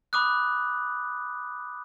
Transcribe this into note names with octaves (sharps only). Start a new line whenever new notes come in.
B5 D6 D#6 F#6